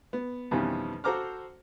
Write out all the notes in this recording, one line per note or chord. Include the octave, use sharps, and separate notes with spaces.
B3
F2 B2 D#3 E3 G3 C#4
F#4 A4 C5 A#5 D6 F6